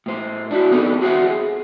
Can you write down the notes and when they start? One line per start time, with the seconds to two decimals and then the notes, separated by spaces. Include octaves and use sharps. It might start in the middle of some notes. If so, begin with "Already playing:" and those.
0.06 A2 C5
0.51 D4 E4 F#4
0.71 B3 C4 D4 D#4 G#4 A4
1.01 F#4 G#4 C5 D5 E5 F#5
1.29 G#4